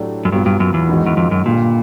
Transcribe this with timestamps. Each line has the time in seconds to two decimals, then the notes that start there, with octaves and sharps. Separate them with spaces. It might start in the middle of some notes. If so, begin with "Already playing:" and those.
Already playing: A2 F#3 A3 D4 G4
0.25 F#2
0.32 G2 A#2 F#3 B3
0.46 G2
0.60 F#2
0.74 E2
0.89 G#2 D#3 G#3 C#4 F#4
1.06 E2
1.17 F2
1.31 F#2
1.45 G2 A#2 D3 G3